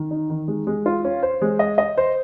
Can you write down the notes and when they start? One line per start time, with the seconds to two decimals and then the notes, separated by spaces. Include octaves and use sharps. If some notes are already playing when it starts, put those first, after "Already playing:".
Already playing: D#3
0.11 D#4
0.30 D#3
0.48 G#3
0.67 G#3
0.86 F4
1.05 C#4
1.23 C5
1.42 G#3
1.59 D#5
1.78 D#5
1.98 C5